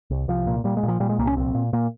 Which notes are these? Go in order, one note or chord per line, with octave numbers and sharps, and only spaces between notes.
C2
C2 F3
A#2
A#2 G3
G#3
A#2
F3
A#2 G3
G#3
C2 A#3
C#4
A#1 C4
A#2
A#2 A#3